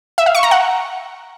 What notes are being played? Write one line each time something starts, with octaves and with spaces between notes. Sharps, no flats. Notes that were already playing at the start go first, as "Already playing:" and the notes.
E5
F5
C#6
A#5
F#5